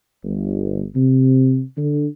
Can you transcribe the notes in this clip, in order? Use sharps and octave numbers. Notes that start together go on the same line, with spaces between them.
G1
C3
D3